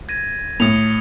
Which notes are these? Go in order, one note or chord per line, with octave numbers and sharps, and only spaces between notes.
G#6 A#6 D#7
A2 D#6 C#7 F7